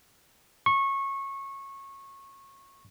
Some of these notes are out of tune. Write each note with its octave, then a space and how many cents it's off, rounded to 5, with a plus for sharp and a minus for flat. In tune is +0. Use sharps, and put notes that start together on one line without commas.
C#6 -20